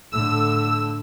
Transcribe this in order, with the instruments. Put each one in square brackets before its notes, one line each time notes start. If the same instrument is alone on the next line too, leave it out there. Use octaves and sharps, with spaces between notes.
[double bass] A2 D3 [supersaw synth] E6